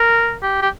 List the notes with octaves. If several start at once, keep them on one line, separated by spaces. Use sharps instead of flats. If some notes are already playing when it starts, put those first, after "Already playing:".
Already playing: A#4
G4
G4